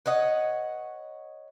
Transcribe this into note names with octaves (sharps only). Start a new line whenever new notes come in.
B4 C#5 D#5 F#5